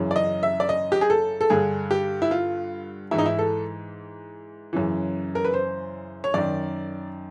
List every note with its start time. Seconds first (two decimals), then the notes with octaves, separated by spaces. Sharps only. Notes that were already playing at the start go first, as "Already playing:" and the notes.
Already playing: F#2 C#3 E3
0.11 D5
0.16 D#5
0.43 E5
0.60 D5
0.69 D#5
0.92 G4
1.01 G#4
1.10 A4
1.41 A4
1.50 G2 D3 G#4
1.91 G4
2.22 E4
2.31 F4
3.11 G#2 E3 E4
3.18 D#4
3.26 E4
3.39 A4
4.73 F#2 C#3 E3
5.35 A#4
5.45 B4
5.54 C5
6.24 C#5
6.34 F#2 D#3 D5